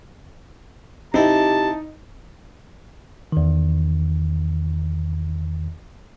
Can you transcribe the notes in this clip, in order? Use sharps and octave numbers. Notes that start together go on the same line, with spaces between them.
C3 D#4 E4 G4 A5
E2 D#3